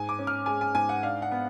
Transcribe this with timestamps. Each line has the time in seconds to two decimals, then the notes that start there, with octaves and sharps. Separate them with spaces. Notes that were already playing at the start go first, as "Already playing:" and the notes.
Already playing: G#2 G#5
0.09 D6
0.19 C#4
0.27 F6
0.46 G#3 G#5
0.61 G#5
0.75 G#2 G#5
0.89 F#5
1.03 D4 F5
1.22 F#5
1.31 B3